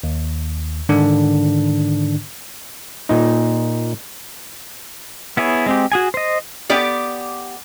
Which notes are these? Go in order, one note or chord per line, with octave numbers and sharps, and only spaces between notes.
D#2
G#2 D3 D#3 D4
A#2 D#4
B3 E4 G#4 C#5
G#3 C4 G4
F#4 G#4 G#5
C5 D#5
B3 G4 D5